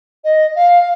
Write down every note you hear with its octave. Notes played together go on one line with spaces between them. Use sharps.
D#5
F5